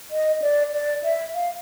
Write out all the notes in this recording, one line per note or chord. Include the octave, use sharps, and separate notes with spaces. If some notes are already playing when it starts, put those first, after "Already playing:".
D#5
D5
D5
E5
F5